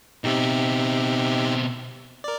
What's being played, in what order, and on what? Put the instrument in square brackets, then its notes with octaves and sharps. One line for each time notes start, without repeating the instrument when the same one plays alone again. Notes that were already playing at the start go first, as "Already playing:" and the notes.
[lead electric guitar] B2 C4 [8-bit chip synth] D#4 G4 E5
[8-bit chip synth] A#4 D5